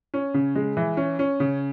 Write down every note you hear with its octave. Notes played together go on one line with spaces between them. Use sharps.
C#4
C#3
G#3
E3
C#4
C#4
C#3